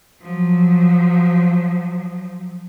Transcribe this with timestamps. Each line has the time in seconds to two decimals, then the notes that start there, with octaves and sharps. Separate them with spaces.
0.22 F3 F#3